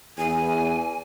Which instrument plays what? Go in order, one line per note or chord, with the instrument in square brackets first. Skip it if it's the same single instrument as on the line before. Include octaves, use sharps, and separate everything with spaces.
[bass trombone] E2 [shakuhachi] G#5